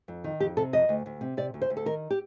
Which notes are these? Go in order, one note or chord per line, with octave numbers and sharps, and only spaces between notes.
F2
D#3
F2 G4
C3 A4
F2 D#5
D2
D2
C3
C3 D5
D2
C5
D2
A4
D#3 A#4
G4